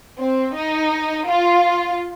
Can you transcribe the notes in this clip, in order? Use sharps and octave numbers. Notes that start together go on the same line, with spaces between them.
C4
D#4
F4